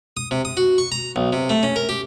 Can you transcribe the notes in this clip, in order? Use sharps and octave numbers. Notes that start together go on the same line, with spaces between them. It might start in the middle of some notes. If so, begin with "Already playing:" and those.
D#6
C3
D#6
F#4
C#6
A#5
B1
C3
A3
C#4
A#4
G4